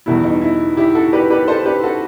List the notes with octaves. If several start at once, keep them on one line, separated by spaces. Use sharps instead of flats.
E2 B2 G3 E4
D#4
E4
E4 G4
F#4 A4
G4 B4
G4 B4
A4 C5
G4 B4
F#4 A4